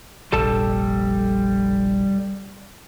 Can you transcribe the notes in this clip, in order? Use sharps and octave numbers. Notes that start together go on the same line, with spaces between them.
F1 A#1 G3 A4 A5